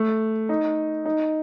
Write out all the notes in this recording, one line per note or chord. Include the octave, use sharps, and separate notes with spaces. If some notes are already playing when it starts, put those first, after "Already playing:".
Already playing: A3
D#4
D#4